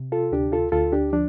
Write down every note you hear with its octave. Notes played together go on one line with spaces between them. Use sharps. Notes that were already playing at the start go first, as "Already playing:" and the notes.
Already playing: C3
F4 A4
D2 D4 G4
F4 A4
D2 F4 A4
D4 G4
F3 D4